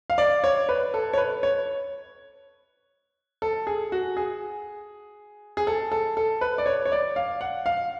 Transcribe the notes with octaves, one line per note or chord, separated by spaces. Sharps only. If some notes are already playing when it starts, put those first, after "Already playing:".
F5
D5
C#5
B4
A4
C#5
B4
C#5
A4
G#4
F#4
G#4
G#4
A4
A4
A4
B4
D5
C#5
C#5
D5
F5
F#5
F5